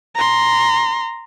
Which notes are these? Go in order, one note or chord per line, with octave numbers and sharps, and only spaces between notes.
A#5 C6